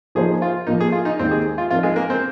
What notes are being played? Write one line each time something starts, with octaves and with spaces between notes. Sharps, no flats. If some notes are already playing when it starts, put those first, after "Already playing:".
F3 A#3 D#4 G#4 C5
F4
A#2 F3 A#3 D#4
G#4
F4
D#4
D#2 D#3 G#3 C4 D#4
G#4
F4
F3 C4 D#4 F4 A#4
G#3
A#3
C4